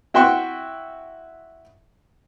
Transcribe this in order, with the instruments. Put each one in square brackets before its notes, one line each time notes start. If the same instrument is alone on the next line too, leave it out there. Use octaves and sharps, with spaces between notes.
[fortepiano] E4 F#4 E5 G5 C6 C#6